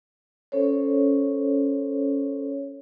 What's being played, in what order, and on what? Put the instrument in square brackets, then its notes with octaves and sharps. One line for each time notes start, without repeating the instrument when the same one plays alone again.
[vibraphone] C#4 A4 C5 C#5